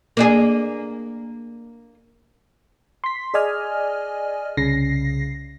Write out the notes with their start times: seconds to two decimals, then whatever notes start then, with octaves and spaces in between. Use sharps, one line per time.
0.17 A#3 D4 G#4
3.04 C6 B6
3.34 G#4 D5 D#5 G#5 F6
4.57 C2 C#3 A#6 C7